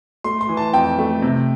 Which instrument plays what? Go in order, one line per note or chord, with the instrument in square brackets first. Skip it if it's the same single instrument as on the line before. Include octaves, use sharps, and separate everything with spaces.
[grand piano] A3 C6
C6
E3
A5
F2 G5
A3
C3